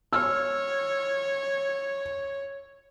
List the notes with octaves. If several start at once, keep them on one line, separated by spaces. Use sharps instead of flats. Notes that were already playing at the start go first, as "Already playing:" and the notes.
C#5 E6 F6